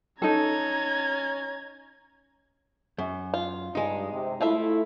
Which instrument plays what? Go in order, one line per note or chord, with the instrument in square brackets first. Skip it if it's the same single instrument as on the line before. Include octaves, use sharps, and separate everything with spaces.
[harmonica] C#4 [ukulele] D#4 A4 [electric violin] A#5 G#6
[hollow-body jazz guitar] F#2
[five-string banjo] F4
[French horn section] G2 [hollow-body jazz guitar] G#3 D#4
[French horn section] C3
[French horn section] A3 E4 [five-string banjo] F4 A4 E5